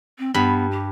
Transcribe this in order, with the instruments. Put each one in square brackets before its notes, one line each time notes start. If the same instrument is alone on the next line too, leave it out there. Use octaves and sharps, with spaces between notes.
[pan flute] C4
[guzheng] G2 B5 [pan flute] B3
[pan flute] G4